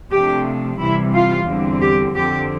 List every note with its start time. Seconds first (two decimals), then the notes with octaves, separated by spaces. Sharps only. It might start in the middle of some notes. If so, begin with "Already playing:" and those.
0.11 C3 F3 A3 D4 G4
0.78 C3 E3 G3 E4
1.13 F4
1.46 E2 D3 G3 C4
1.81 G4
2.15 F2 D3 F3 C4 G4